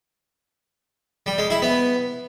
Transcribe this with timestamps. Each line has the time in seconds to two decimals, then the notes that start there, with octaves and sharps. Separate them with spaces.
1.26 G3
1.38 G#3
1.50 E4
1.62 B3